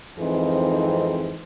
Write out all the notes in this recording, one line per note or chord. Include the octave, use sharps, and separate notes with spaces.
F2 G#2 E3 C4 D#4 G#4